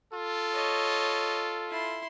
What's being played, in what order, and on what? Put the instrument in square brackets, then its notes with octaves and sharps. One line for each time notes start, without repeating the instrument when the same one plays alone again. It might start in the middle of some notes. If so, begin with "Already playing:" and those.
[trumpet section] F4 A4
[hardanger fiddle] C#5 D#5
E4 C6